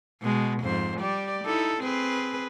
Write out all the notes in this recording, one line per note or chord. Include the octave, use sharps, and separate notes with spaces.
B2 G#3
F2 G#2 C5
G3 G4 D5
D#4 E4 A4
C4 G#4 B4